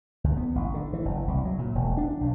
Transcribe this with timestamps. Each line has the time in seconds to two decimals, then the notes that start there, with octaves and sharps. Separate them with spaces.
0.24 D2
0.37 B3
0.55 A1
0.74 D3
0.93 E3
1.05 F#1
1.28 C2
1.45 F#3
1.58 A#2
1.75 E1
1.97 D4
2.21 B1